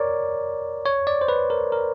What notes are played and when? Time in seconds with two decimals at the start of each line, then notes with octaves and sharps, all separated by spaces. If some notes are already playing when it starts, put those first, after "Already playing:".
Already playing: A#4 C#5 D5
0.86 C#5
1.07 D5
1.21 C5
1.28 B4
1.50 A#4
1.72 A#4